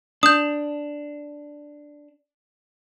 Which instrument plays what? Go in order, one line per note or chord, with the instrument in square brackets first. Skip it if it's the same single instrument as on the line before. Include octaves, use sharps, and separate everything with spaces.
[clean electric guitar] D4 [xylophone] D#6 G6